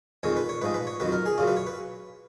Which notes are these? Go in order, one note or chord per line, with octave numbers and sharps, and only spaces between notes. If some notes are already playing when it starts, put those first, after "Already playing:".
F2 D#3 G#3 C#5
B4
C#5
G#2 F3 G#3 B4
B4
C#5
F2 D#3 F#3 B4
A#4
G#4
F#2 C#3 F#3 F4
B4
C#5
B4